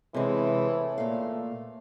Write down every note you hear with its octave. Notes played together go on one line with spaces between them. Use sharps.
A2 C3 E3 G#3
A#2 A3 F5